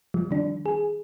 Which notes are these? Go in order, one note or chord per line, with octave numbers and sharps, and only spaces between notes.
F3 G3
D#3 D4
G#4